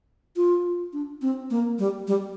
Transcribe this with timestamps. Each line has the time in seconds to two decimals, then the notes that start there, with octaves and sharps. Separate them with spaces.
0.36 F4
0.93 D4
1.22 C4
1.50 A#3
1.79 G3
2.08 G3